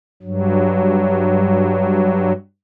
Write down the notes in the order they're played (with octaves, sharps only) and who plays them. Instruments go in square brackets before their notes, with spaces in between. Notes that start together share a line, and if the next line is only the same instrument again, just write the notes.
[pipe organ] G2 F#3